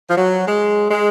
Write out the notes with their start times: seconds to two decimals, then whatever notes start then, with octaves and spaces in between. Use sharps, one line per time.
0.10 F3
0.17 F#3
0.47 G#3
0.91 G#3